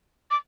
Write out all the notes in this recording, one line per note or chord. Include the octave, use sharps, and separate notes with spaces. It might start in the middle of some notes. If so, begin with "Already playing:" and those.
D6